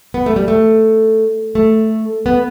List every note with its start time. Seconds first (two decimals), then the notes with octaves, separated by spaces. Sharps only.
0.14 B3
0.26 A3
0.36 G3
0.48 A3
1.55 A3
2.26 B3